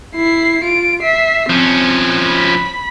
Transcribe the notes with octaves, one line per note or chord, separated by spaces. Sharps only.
E4 C7
F4 D7
E5 C7
F3 C4 C#4
B5